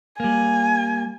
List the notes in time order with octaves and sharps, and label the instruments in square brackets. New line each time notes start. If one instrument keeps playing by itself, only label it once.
[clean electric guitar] G3 A#3 [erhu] G#5